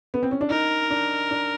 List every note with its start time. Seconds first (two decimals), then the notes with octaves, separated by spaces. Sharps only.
0.14 B3
0.23 C4
0.31 C#4
0.41 D4
0.50 D#4 A#4
0.90 D4
1.31 D4